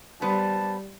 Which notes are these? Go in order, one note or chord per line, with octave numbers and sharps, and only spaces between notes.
G3 B3 B4 C5 A5